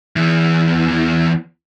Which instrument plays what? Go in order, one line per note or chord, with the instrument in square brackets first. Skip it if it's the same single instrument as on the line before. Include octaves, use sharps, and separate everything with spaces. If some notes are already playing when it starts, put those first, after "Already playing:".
[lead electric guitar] E2 E3